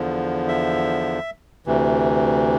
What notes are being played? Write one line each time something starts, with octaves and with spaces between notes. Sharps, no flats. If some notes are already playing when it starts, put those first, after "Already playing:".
Already playing: E2 D3 F3
E5
D2 C3 E3